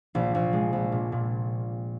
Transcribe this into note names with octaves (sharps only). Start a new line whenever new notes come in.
A#1
A#1
G#3
A#1
A#2
A#2